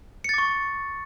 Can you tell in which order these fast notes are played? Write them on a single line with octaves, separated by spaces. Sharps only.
C#7 A6 D6 C#6